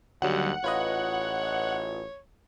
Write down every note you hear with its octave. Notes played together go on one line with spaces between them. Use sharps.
D#2 D3 F#3 G3 F#5
A1 F4 B4 C#5 D#5